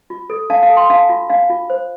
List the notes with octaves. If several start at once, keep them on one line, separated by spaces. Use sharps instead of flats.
F4
A4
D4 F5 A5
F5 A5
A4
G5 C6
D4 F5 A5
F4
D4 F5
F4
C5